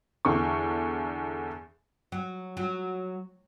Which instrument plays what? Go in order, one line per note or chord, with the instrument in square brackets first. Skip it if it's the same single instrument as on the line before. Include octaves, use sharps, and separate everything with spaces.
[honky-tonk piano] E2 D3 C#6
[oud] F#3
F#3